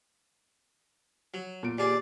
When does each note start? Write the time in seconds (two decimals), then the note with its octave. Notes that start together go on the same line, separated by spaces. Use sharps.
1.34 F#3
1.63 A#2 D7
1.78 D#2 G#4 D5